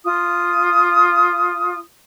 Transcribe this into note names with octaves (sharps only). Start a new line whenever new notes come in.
F4 D#6